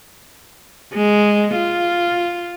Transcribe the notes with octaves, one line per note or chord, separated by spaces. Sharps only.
G#3
F4